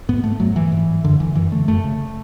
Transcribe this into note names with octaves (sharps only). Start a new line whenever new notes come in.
G#2 B3
A3
G#2 F#3
E3
G#2
F#2 D3
D3 E3
F#2 E3
D3 A3
F#2 A3
C#3